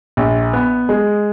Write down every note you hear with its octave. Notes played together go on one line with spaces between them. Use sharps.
A#1
B3
G#3